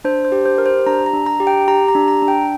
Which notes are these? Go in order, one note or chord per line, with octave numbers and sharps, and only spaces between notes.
D4 C5
C5
G4
C5
G4 A#4
C5
D4 A#5
A#5
D4
A#5
G4
G5
G4 A#5
A#5
D4
A#5
D4
G5